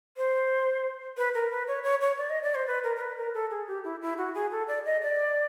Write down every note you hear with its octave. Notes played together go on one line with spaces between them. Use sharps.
C5
B4
A#4
B4
C#5
C#5
C#5
D5
D#5
D5
C5
B4
A#4
A#4
B4
A#4
A4
G#4
G4
E4
E4
F#4
G#4
A4
D5
D#5
D5